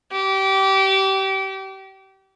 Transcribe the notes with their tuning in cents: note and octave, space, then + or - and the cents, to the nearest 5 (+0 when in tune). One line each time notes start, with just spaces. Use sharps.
G4 -25